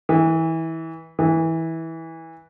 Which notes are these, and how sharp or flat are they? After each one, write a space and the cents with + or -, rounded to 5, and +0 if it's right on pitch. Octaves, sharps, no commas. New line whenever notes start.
E3 -25
E3 -20